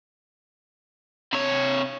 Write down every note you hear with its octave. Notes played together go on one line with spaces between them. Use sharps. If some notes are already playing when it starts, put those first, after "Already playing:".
C3 C#5